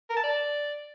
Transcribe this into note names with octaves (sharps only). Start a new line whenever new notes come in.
A#4
A5
D5